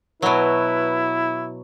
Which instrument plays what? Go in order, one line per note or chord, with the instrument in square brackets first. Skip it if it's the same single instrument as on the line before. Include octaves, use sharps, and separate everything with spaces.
[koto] B2 F#3 [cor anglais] E4 [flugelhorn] B4